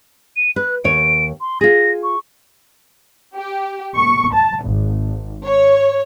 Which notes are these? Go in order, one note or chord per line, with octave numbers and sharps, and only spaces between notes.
D#7
B4 F#6
D#2 C#5 D7
C6
F4 G#4 A#6
C#6
G4
C#6
A5
G#1
C#5